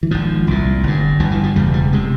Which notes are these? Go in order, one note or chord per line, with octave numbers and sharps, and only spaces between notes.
E3
G#1 G#2 F3
C2 A#2
G1 G2
G1 G2 F3
E3
F3
E1 E2 C#3 G3
G3
C3 G#3